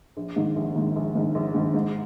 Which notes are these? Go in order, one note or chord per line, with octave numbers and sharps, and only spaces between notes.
A#1
G#2 D#3
A#1
G#2 D#3
A#1
G#2 D#3
A#1
G#2 D#3
G#2